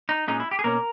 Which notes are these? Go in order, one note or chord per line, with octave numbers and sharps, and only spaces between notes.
D#4
A#2 G#3 C#4 D#4
E4
G4
G#4
B2 A#3 C#4 A#4